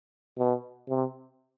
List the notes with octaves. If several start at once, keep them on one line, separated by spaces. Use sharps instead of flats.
B2
C3